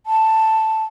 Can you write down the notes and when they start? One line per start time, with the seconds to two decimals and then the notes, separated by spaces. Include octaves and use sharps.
0.06 A5